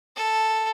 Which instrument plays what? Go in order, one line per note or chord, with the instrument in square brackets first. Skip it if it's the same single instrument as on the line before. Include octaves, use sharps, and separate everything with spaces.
[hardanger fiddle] A4